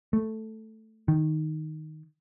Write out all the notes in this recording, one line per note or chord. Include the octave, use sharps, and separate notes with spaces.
A3
D#3